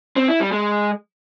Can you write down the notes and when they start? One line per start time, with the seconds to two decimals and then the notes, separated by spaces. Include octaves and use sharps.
0.16 C4
0.28 E4
0.40 G3
0.52 G#3